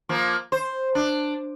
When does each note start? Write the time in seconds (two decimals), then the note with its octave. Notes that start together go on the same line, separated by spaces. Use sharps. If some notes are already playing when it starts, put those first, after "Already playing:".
0.09 F3 A#3
0.52 C5
0.95 D4